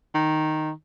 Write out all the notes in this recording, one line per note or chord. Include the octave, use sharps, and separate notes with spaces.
D#3